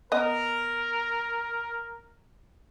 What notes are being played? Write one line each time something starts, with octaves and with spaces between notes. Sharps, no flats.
B3 A#4 D#5